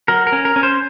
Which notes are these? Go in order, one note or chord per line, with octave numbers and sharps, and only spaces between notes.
F#3 A#4
A#4
C#4
A#4
C#4
C5